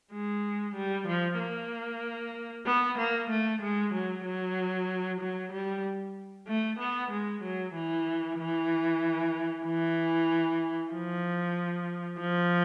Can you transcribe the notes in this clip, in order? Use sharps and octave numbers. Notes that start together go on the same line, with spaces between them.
G#3
G3
F3
A#3
B3
A#3
A3
G#3
F#3
F#3
F#3
G3
A3
B3
G#3
F#3
E3
E3
E3
F3
F3